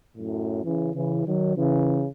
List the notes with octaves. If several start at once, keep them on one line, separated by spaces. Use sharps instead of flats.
F#2 A2
C#3 E3
C#3 E3
D#3 F#3
C#3 E3